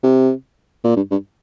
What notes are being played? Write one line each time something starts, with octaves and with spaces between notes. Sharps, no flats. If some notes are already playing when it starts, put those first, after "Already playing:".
C3
A#2
G2
G2